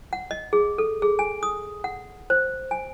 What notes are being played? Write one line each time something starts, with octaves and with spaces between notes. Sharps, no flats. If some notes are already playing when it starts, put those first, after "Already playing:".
F#5
D#5
G#4
A4
G#4
G#5
D#6
F#5
C5
G#5